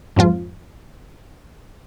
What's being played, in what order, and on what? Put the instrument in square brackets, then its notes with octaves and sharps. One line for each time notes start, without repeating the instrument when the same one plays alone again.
[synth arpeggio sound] F2 G#2 F3 F4